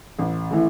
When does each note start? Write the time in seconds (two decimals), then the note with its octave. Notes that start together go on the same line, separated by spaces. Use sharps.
0.19 A1
0.51 A2 E3